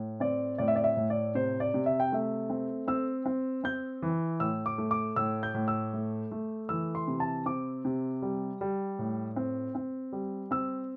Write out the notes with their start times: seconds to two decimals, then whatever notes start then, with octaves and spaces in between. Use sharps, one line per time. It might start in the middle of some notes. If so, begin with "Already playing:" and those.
Already playing: A2
0.20 C4 D5
0.58 A2 D5
0.68 E5
0.76 D5
0.84 E5
0.97 A2
1.10 D5
1.35 C3 C5
1.60 D5
1.74 C3
1.86 E5
2.00 G5
2.12 A3 E5
2.50 C4
2.88 C4 E6
3.26 C4
3.64 C4 G6
4.02 E3
4.40 A2 E6
4.66 D6
4.78 A3
4.91 D6
5.16 A2 E6
5.43 G6
5.54 A2
5.68 E6
5.93 A3
6.31 A3
6.69 E3 E6
6.95 C6
7.08 C3
7.20 A5
7.46 C4 D6
7.85 C3
8.22 G3
8.61 G3
8.99 A2
9.36 C4
9.75 C4
10.12 G3
10.51 C4 E6